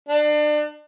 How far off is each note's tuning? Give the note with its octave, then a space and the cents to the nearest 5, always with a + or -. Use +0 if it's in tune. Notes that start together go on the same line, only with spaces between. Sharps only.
D4 +30